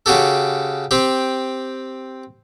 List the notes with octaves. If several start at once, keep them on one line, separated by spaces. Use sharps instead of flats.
C#3 F#4 G4 A4
C4 G4